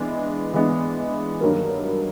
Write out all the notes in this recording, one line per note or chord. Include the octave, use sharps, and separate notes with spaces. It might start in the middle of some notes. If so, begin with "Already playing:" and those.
Already playing: E3 G#3 B3 D4
E3 G#3 B3 D4
G2 D#3 F#3 A#3